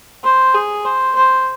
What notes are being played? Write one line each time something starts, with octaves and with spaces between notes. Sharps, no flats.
C5
G#4
C5
C5